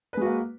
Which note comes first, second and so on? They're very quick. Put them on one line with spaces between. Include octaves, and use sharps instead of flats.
B4 G#3 F#4 A#3